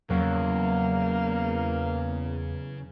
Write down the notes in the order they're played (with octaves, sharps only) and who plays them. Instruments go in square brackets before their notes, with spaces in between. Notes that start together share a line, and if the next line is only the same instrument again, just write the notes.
[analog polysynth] E2 [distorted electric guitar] C#3 [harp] F#3 [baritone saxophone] A#3